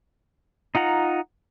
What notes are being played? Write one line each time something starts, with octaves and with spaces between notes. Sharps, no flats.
D#4 F4 F#5 A#5